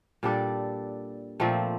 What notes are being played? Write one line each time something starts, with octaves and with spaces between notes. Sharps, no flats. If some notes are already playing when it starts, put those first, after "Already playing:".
A#2 G3 D4 A4
A#2 F3 A3 C4